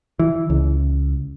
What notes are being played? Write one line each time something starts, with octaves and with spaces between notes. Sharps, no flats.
E3
C#2